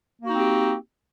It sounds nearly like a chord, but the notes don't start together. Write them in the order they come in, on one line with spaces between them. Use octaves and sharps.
A#3 F#4 D#4 C4 G4